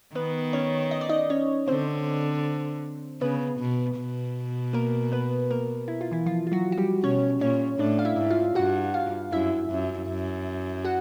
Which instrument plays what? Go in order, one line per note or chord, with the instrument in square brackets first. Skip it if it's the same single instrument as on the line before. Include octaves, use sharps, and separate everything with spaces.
[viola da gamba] D#3 [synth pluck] B3 B4
[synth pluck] C#4 C#5
D#5
D5
D#4 D#5
C#4 C#5
[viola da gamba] D3 [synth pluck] C4 C5
[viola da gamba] C#3 [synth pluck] B3 B4
[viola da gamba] B2
B2
[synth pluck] A#3 A#4
B3 B4
A#3 A#4
E4
F4
E3 E4
F3 F4
F4
F#3 F#4
F#4
G3 G4
[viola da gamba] B2 [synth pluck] C#4 C#5
[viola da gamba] A#2 [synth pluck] C#4 C#5
[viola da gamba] A2 [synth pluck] D4 D5
[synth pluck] F5
E4 E5
[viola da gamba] G#2
[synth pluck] F4 F5
[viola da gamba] G2 [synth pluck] F#4 F#5
[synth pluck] F4 F5
[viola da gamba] F#2 [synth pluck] E4 E5
[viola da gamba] F#2
F#2
[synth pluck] F#4 F#5